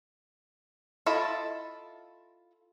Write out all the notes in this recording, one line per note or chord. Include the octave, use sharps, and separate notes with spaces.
E4 F4 A4 D#5 E5